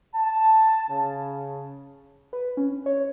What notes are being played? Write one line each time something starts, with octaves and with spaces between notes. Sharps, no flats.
A5
C#3
B4
C#4
C#5